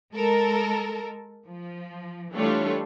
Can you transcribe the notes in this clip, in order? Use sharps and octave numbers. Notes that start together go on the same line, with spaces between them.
G#3 A4 A#4
F3
E3 G3 A3 D4 F4 C#5